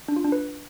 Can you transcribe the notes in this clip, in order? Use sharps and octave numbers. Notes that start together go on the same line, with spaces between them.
D4
F4
D4
B4